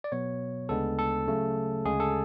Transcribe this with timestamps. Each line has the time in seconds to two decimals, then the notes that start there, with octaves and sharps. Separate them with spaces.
0.04 D5
0.12 B2 F#3 B3 C#5
0.69 D2 C#3 G#3 B3 D4 A4
0.98 A4
1.27 C#3 F#3 A3
1.85 D2 C#3 G#3 G#4
2.00 A4